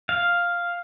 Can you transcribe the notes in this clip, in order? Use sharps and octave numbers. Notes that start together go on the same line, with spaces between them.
F5